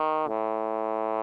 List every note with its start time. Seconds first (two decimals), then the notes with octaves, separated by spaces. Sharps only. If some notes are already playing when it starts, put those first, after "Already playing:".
Already playing: D#3
0.28 A2